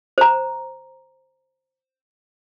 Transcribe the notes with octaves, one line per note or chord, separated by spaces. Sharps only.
C5 A#5